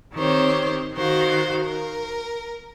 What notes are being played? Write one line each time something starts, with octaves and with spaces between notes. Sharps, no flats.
D#3 C4 G4 C5 C#5
D#3 F#4 C5 F5
A#4